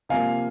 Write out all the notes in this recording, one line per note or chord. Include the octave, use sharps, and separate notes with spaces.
C3 F3 A#3 F5 G#5